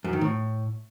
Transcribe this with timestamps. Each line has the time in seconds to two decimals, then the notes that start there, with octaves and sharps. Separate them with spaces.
0.04 F#2
0.13 D#3
0.21 A2